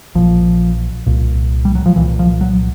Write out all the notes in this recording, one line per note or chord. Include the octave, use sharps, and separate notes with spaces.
A#1 A#2 F3
C2 A#2
G3
F#3
F3
C2 A#2 E3
F3
F#3